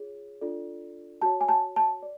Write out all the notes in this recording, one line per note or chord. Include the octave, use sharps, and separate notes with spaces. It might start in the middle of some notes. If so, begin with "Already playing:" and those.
Already playing: F4 G#4 C#5
D4 F4 A4 D5
F#4 C#5 A5
G#5
A5
A5
D5